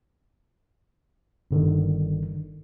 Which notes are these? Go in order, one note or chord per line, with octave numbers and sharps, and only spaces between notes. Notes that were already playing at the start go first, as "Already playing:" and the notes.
G1 D3 D#3